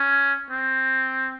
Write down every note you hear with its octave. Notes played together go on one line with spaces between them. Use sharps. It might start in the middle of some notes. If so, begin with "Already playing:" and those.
Already playing: C#4
C4